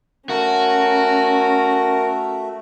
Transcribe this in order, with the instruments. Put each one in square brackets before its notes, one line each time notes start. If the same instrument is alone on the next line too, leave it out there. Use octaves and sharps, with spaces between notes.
[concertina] A3 [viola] C#4 [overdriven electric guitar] F#4 [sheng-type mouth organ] A#4